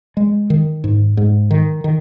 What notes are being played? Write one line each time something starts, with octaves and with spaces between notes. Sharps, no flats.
G#3
D#3
G#2
G#2
D#3
D#3